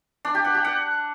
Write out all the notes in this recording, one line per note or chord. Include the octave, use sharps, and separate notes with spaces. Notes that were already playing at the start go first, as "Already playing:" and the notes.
D4
G4
F#5
G4
F#5